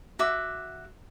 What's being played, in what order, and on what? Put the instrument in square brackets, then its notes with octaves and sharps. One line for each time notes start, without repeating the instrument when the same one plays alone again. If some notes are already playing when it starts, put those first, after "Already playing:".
[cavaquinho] F#4 E5 D6